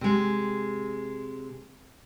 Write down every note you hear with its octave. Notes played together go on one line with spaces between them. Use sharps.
C3 G#3